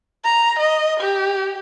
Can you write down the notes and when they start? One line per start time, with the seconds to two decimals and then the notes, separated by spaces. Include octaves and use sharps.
0.24 A#5
0.59 D#5
1.00 G4